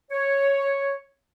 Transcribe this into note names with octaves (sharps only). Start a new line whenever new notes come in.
C#5